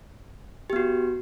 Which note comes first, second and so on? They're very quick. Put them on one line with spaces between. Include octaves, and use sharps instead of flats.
G4 B3 F#4